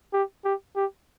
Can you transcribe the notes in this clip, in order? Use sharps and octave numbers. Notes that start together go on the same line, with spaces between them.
G4
G4
G4